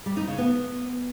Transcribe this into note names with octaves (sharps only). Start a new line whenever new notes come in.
G3
D#4
C#3
B3